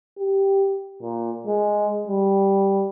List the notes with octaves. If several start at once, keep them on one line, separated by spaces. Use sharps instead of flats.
G4
A#2
G#3
G3